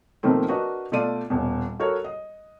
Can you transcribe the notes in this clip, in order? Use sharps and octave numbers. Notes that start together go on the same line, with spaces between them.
B2 D#3 F3 A3 A#3 C4
D4 F#4 A#4 B4 D#5
B2 A3 F4 D5 D#7
D#1 B2
F#4 A4 A#4 C#5
D#5